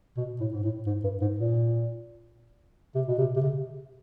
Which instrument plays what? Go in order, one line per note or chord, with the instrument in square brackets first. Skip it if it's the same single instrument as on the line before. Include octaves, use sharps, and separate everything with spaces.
[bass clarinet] B2
A2
G#2
A2
G#2
G2
G#2
A#2
C3
B2
C3
C3
C#3